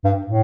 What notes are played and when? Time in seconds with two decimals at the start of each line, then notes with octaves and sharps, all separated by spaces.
0.04 G2
0.27 A2